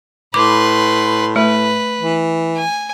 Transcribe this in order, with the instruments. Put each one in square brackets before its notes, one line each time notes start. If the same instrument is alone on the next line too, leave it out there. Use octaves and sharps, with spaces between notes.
[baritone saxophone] A2 [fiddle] B4 C6 [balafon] D6
[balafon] A3 [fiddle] B4
[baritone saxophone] E3
[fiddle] G#5